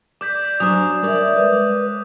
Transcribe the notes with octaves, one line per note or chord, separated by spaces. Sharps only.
D5 D6 G6 B6
F#3 D4 C5 G#5 D#6
G3 A#4 C#5 D5 E5
G#3 B4 D6